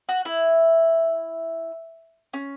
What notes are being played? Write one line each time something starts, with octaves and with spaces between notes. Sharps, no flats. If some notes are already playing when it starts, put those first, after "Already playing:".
F#4
E4
C#4